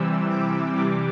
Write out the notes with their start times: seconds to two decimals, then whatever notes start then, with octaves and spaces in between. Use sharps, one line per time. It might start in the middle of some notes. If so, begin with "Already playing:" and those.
Already playing: C3 E3 G3 E6
0.29 D6
0.75 C3 E3 G3 D6